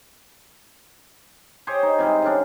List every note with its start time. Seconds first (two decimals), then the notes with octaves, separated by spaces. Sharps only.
1.67 G4 G#4 C5 C#5
1.83 D#4
1.99 C3 G3 G#3
2.22 D3 C#4 D4